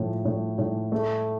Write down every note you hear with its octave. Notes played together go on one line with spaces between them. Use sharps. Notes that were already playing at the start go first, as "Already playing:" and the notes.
Already playing: A2 F3
A2
A2
A3